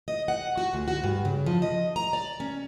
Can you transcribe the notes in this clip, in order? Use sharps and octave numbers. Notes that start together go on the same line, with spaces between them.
D#5
F#5
F#4
D2
F#4
G2
C#3
F3
D#5
A#5
D5
C#4